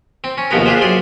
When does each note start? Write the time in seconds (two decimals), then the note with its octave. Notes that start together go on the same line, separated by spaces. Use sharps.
0.24 C4
0.38 C#4
0.51 A#1 D#2 C3 F3 B3 A#4
0.66 D4 F4 G4 G#4 C5
0.81 F#2 G#4 D5 C6